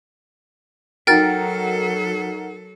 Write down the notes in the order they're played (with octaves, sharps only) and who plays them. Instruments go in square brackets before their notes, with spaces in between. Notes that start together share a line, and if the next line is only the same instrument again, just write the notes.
[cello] F#3 A4 [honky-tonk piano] D#4 F#4 A#4 [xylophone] G5 F6 A6